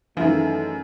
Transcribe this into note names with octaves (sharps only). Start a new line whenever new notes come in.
F#2 D#3 E3 G#3 A3 E4 F4